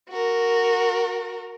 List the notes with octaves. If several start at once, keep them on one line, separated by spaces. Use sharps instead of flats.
F#4 A#4